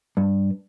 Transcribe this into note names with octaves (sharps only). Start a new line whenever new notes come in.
G2